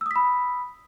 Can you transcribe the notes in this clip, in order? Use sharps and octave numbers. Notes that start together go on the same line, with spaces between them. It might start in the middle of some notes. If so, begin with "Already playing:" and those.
B5 D#6 E6 B6